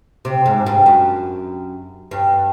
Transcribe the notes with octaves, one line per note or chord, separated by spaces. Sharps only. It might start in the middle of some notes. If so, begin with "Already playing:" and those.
C3
G#2
G2
F#2
G2